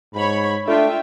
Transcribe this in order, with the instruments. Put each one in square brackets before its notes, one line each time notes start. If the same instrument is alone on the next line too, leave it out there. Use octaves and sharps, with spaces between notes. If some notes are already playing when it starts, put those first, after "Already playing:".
[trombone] G#2 [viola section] C#5 B5
[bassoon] A3 [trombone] D4 [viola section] F4 E5 G5